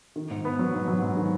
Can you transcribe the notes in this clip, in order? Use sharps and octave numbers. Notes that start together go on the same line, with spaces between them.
D#3
G#2
B3
F#3
G#2
F#3
G#2
D#3